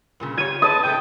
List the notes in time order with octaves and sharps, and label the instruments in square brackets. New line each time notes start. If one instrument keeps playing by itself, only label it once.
[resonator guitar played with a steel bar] G2 A#2 C#3
[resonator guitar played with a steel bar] F4 G4 C#5 [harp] G#6 D#7
[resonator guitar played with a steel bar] G#4 B4 D#5 [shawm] A5 [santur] D#6
[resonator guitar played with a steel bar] G#2 C#3 A3 [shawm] G5